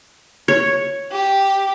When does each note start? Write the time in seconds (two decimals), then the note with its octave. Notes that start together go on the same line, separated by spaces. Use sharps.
0.48 C#5
1.12 G4